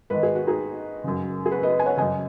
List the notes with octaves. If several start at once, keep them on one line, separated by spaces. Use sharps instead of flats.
G#2 D#3 B4
G#4
F#4
D#4 G#4
F#2 C#3
G#4
F#4 B4
B4 D#5
G#5
C#5 F#5
F#2 C#3 D#5 G#5